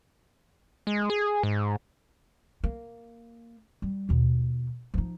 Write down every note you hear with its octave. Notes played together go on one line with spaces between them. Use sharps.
G#3
G#4
G#2
A#3
G3
D#2 B2
F3 D#4